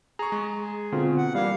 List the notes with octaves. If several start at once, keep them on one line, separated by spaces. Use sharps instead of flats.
G#4 A#5 C#6
G#3
G#4
B2 D3 C4 F4
F#5
E3 G3 A#3 F5